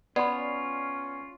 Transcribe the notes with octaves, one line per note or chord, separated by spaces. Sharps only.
B3 C#4 F4 D5 B5